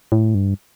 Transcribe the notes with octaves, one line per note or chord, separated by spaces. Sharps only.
A2
G2